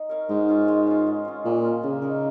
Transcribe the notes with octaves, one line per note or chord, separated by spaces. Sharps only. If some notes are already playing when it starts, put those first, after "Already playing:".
Already playing: D#4
A#4 C#5 F5
G#2 G#3
C#4 F4
G#3
C#4 F4
G#3
C#4 F4
A#2 G#3
C#4 F4
C#3 A#3
D#4 A#4